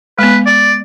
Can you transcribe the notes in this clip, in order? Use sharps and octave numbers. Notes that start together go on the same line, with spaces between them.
G#3 B3 B4
D5